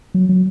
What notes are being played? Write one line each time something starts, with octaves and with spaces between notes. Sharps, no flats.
F#3
F#3